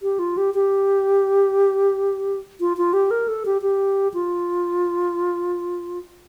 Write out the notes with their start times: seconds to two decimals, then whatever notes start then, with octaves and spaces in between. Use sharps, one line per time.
0.02 G4
0.19 F4
0.37 G4
0.54 G4
2.60 F4
2.77 F4
2.93 G4
3.11 A#4
3.28 A4
3.46 G4
3.62 G4
4.14 F4